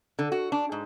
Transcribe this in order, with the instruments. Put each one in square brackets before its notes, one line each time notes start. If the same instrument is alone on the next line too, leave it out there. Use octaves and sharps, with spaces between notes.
[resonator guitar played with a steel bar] D3
F#4
D4
G#2